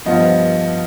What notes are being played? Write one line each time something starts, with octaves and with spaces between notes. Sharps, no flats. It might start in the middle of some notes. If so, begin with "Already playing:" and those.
G2 F3 B3 D#5